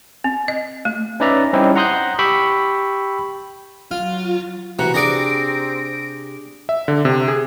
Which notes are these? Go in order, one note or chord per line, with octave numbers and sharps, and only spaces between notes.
C4
D#5
A3
C#4 D#4 B4 D5 E5 A#5
G3 C4 C#4 D#4 E4 G4
F#5 A#5 C6 D#6 F#6 G6
G4 G5 B5 C#6 E6
F#3 F4 F5
C3 E3 F#4 G4 A#5
C4 D4 G#4 D5 A#6 D7
E5
D3
C3
G#4